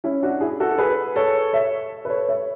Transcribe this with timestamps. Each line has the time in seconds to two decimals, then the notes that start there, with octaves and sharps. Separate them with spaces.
0.04 C#4 E4
0.23 D4 F#4
0.41 E4 G#4
0.60 F#4 A4
0.78 G#4 B4
1.16 A4 C#5
1.53 C#5 E5
2.05 B4
2.10 A4 C#5
2.29 C#5 E5